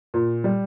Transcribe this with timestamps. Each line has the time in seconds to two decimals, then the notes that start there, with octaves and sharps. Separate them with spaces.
0.14 A#2
0.44 G3